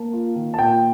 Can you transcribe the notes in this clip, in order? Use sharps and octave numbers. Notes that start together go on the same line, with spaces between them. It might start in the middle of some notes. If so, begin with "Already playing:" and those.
Already playing: A#3 A5
F4
D#3
A5
A#2 G5